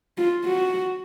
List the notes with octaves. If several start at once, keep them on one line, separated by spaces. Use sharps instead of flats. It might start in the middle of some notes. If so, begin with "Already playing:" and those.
F4
F#4